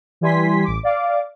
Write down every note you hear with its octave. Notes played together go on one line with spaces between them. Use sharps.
E3 G3 G#5 C6 B6
A1 D6
D5 F5 D6